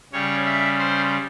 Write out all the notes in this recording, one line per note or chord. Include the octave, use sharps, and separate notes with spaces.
C#3 G3 C#5
E5
C5